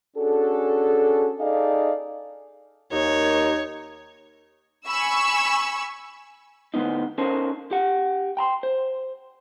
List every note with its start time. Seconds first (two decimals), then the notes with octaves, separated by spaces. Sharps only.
0.16 C#4 D4 F#4 G#4 A4
1.40 D#4 G#4 A4 D5 D#5 F5
2.92 D#2 D#4 C#5
4.86 G#5 B5 C#6 E6
6.74 A2 D3 A3 B3 C4 D#4
7.18 C#4 D#4 A4 A#4 C5
7.71 G4 F#5
8.37 G5 A#5 C6
8.63 C5